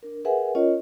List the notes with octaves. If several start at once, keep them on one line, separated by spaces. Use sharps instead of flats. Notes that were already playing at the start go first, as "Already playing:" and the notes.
D4 A#4
G#4 A#4 B4 E5 F#5 G#5
C#4 F4 A#4 C#5 D#5